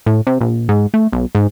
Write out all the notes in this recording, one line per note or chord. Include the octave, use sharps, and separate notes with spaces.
A2
C3
A#1
G#2
A3
B1
G#2